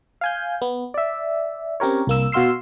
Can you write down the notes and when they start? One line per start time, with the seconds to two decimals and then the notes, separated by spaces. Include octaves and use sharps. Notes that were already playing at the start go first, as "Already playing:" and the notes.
0.21 F5 G#5 G6
0.62 B3
0.94 D5 E5
1.80 C4 C#4 G4 A#4 C#5
2.07 C2 A#3 E6
2.32 B2 F#4 F5 C6 E6 C7